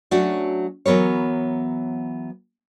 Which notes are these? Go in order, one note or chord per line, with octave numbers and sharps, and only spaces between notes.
F#3 A3 C#4 D4 F#4
E3 F#3 B3 A#4 C#5